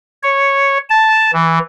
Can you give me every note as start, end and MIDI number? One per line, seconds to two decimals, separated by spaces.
0.23 0.78 73
0.90 1.31 81
1.33 1.59 52